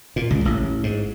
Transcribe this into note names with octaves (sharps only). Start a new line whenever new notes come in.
A#2
C#2
A1
G#2